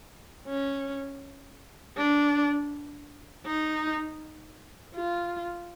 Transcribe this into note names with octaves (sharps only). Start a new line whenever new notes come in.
C#4
D4
D#4
F4